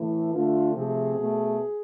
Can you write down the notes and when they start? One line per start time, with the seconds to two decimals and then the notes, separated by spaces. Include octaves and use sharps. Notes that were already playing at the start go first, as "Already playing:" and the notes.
Already playing: A2 E3 A3 E4
0.34 D3 A3 F4
0.74 C3 F3 A3 G#4
1.16 B2 A3